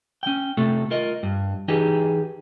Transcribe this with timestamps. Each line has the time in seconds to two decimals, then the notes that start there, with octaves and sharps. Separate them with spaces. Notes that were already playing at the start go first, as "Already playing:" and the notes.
0.23 C#4 G5
0.57 C3 A3 A4
0.91 F4 A#4 D#5
1.23 G2
1.68 E3 D#4 G4 G#4 B4